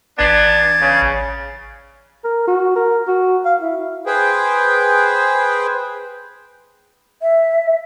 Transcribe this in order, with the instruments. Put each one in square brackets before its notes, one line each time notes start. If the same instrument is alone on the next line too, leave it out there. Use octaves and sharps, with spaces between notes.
[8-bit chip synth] A1 G#6 A6 [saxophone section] B3 D4
[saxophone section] C#3
[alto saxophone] A#4
F#4
A#4
F#4
F5
E4
[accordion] G#4 B4 C5 G5
[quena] E5